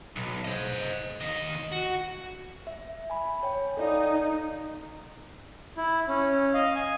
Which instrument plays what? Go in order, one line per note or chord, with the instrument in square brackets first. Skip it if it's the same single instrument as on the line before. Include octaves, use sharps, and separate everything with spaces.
[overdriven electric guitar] B1
C5 D#5
D#2 D#5
F#4
[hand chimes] E5
G#5 B5
C#5 G5
[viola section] D#4 [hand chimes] A4 D5 F5
[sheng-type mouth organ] E4
C#4
D#5 F5 F6
G#5